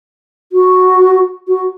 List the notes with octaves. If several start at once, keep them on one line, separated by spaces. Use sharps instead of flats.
F#4
F#4